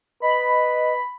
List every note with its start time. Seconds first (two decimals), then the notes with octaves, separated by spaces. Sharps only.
0.22 B4 D#5 B5